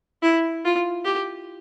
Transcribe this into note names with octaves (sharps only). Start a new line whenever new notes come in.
E4
F4
G4